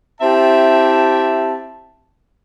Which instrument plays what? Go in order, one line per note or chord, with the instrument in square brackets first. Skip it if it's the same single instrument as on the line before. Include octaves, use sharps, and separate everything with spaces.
[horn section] C4 E4 G4 E5 A5